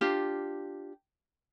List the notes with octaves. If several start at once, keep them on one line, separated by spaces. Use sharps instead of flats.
D4 F4 G4